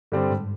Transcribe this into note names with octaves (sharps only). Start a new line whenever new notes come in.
G2 D3 G3 C4
G#2